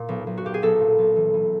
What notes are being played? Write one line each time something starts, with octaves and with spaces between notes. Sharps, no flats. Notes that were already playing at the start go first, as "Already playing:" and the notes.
Already playing: A#2
B1
B1
F#4
A#2 G4
G#4
B1 A4
A#2
B1
E3
E3